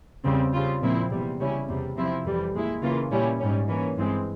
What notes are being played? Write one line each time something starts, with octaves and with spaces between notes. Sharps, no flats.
E2 C#3 G3 C4
C#3 G3 C4 F4
A#2 F3 C4 E4
E2 C3 G3
C#3 G3 C#4 E4
E2 C3 G3
C3 F3 C4 E4
F2 E3 G3
A#2 G#3 E4
C#3 E3 A#3 F4
A#2 G3 C#4 E4
G#2 G3 C#4
E3 A#3 C#4
G2 E3 G#3 C4